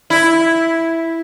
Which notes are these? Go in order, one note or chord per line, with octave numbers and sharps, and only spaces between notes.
E4